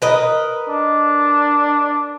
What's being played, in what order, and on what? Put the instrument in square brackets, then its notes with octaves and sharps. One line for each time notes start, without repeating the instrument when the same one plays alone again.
[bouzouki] A#4 B4 D#5
[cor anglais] D4